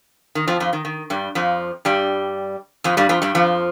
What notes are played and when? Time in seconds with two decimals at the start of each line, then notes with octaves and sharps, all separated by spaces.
0.35 D#3
0.47 F2 F3
0.60 F2 F3
0.73 D#3
0.85 D#3
1.10 G2 G3
1.35 F2 F3
1.85 G2 G3
2.84 F2 F3
2.97 G2 G3
3.09 F2 F3
3.22 G2 G3
3.35 F2 F3